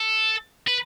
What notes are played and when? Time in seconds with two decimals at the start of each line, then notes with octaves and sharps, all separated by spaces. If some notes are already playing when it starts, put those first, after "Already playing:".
Already playing: A4
0.68 B4